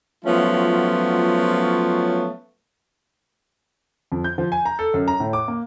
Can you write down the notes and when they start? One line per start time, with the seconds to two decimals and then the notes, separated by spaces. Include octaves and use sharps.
0.25 F3 F#3 A3 B3 C#4 F4
4.12 F2
4.24 G6
4.38 F3
4.52 G#5
4.66 A#5
4.79 A4
4.94 F#2
5.08 A#5
5.20 A2
5.33 D6
5.48 A#3